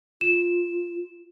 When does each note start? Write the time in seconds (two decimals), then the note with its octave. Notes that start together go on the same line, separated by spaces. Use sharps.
0.21 F4 E7